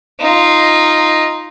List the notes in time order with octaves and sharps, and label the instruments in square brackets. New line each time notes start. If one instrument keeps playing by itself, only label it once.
[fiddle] D#4 F4